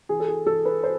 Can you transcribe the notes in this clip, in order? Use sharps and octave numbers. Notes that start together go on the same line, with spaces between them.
E3 G#4
A4
G#4
E3 A4
B4
C5